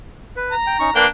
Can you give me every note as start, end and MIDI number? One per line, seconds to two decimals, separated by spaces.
0.36 0.55 71
0.52 0.91 82
0.67 0.77 79
0.80 0.90 61
0.80 0.90 63
0.80 0.90 85
0.95 1.06 58
0.95 1.06 62
0.95 1.06 71
0.95 1.06 77
0.95 1.06 79